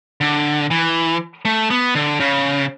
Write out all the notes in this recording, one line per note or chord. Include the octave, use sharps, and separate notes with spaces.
D3
E3
A3
B3
D3
C#3